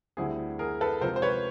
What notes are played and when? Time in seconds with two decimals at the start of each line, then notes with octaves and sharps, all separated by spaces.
0.17 D2 D3 G3 C4 E4 G#4
0.59 G#4 A#4
0.81 A4 B4
1.01 C3 F3 G#3 C4 F4 A#4 C5
1.16 C5
1.22 B4 C#5